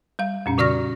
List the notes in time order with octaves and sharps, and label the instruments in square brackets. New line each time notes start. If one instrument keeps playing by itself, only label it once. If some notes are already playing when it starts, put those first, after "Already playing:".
[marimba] G3 F5
F2 A#2 C#4
C#3 F#4 D5 C#6 F6 A#6